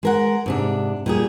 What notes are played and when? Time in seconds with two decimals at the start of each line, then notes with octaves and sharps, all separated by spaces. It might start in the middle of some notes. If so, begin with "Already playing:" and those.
0.03 G#3 A#4 F#5
0.46 G#2 C3 D4
1.06 A#2 G3 G#4